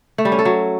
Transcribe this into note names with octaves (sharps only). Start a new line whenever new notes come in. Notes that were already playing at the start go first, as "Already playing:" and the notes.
A3
G3
C#4
A4
F#3